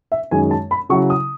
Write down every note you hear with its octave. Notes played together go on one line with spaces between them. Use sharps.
E5
F#2 D#3 G#3 G#5
A5
B5
C#3 F#3 C#4 E4 C#6
D#6